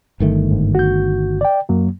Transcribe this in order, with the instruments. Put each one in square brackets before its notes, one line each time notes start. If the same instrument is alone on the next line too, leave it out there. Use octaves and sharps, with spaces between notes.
[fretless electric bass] G1 D#3 A3
[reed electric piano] G#2
F#4 G6
D5 G5
F#2 F#3 A#3